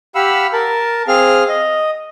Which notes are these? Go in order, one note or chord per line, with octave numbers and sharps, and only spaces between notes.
G4 F5 F#5 B5 E6
A#4 A5
C4 G#4 F5 F6
D#5